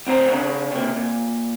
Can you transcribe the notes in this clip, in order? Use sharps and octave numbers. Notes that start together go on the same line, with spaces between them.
D2 C4 C5 A#5
C#3 C#4 D4
C3 A#3
A#2